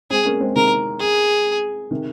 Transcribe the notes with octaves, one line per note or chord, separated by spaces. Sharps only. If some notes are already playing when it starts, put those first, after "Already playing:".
G#3 C4 G#4
A#3 C#4
G#3 C4
C3 D#3 A#4
G#4
C3 D#3